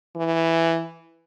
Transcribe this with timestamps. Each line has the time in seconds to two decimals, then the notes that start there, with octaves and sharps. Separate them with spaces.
0.16 E3